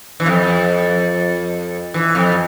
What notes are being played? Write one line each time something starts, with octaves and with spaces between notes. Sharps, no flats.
E3
F2
E3
F2